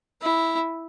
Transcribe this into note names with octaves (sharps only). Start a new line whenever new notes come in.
E4